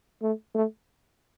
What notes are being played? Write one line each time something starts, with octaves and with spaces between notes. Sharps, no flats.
A3
A3